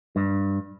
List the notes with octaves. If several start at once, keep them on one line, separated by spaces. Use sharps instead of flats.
G2